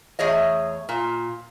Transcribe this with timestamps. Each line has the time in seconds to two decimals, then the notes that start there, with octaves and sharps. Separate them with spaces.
0.19 E2 A3 G#4 C#5 D#5
0.89 A#2